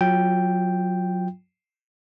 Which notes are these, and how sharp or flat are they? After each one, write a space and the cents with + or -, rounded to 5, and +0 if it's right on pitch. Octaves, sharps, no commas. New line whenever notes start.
F#3 -20 F4 +0 G5 +0